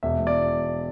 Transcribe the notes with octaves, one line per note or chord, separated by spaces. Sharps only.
E1 E5
E1
D5